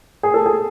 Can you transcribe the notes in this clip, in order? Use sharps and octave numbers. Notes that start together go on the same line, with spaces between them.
G#4
A4
G#4